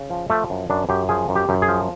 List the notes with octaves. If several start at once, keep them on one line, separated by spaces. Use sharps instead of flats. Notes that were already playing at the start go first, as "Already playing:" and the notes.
Already playing: C#3
F3
F3 A3
F#2
F#2 D4
F#2 G4
F3 G#4
F#2
G4
F#2
G#4
F3